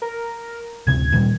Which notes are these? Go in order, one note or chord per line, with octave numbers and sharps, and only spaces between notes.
A#4
D1 C3 G#6
A#2 D#3 G3